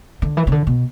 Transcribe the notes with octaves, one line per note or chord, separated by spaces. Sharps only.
D3
E3
C#3
D3
B2